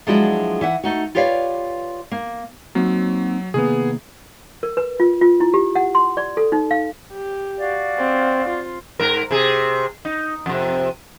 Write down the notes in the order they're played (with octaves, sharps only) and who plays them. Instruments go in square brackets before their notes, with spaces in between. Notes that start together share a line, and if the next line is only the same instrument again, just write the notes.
[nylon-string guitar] F3 F#3 G#3 D4 E4 F#4
E3 E5 F#5
A3 D#4 F#4
F4 G4 B4 C#5 D5 F5
A#3
[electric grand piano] F#3 [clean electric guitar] A#3 C4 D#4
[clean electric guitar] C3 D#3 A#3 [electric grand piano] B3 G#4
[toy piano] A#4
B4
F4
F4
E4
G4
F#5
C6
D5
A4
D#4
F5
[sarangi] G4
[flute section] F#4 D5 F5
[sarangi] C4
F4
[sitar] G#2 A#4
C3 G#4
D#4
F2 C3